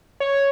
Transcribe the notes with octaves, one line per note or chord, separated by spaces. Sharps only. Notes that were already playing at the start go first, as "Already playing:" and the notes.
C#5